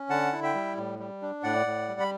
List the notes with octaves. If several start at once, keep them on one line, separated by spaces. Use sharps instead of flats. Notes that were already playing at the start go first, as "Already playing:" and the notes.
Already playing: C#4
D3 F#5 A5
E4
E5 G5
G3
A2
G3
D4
A2 D5 F#5
A2
G3
B5